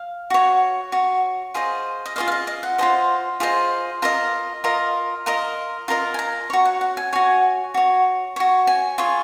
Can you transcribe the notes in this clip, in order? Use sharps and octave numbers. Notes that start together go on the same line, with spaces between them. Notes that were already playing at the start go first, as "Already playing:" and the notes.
Already playing: F5
F#4 C#5
F#4 C#5
F4 G#4 C5 D#5
D#5
F4 G#4 C5 D#5 F5
F5
D#5
D#5
F#5
F4 G#4 C5 D#5
F4 G#4 C5 D#5
F4 A#4 D#5 A#5
F4 A#4 D#5
F4 A#4 D#5
F4 A#4 D#5 A#5
G#5
A#5
F#4 C#5
F#5
F#5
G#5
F#4 C#5 G#5
F#4 C#5
F#4 C#5
G#5
F4 G#4 C#5